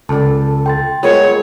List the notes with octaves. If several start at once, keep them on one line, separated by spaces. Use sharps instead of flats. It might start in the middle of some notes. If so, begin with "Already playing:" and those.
C#2 A4 D5 A5
G5 C6 A6
G#3 B3 F4 G#4 A#4 C#5